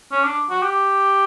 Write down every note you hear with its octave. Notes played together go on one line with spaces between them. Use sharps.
C#4
D4
F#4
G4